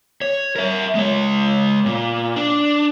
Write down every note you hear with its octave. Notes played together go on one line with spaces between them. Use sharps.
C#5
A#4 E5
G#3 C#5
A#2
D4